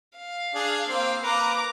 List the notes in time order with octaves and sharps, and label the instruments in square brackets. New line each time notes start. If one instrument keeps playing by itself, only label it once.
[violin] F5
[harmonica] D4 G#4
A#3 C4
[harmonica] A#3 B4 [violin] A#5 D6